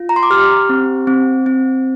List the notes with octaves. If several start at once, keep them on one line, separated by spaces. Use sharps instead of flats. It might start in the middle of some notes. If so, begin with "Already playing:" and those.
Already playing: F4
A#5
C6
D6
G4 F6
C4
C4
C4